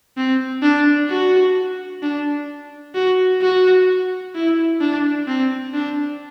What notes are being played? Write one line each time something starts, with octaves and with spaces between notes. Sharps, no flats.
C4
D4
F#4
D4
F#4
F#4
E4
D4
C4
D4